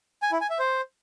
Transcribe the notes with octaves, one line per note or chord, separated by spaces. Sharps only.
G#5
E4
G#5
E5
C5